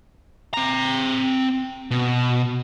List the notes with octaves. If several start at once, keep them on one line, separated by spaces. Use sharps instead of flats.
C4 A#5
B2